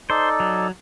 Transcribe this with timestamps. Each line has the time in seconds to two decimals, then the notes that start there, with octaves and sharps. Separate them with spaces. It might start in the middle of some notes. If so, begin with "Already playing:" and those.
0.10 D#4 A4 C5 D5
0.40 F#3